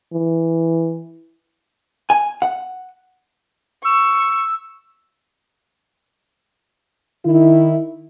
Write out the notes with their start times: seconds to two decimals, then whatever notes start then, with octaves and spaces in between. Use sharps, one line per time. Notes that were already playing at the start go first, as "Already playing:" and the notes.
0.13 E3
2.10 G#5
2.42 F#5
3.84 C#6 E6
7.26 D#3 E4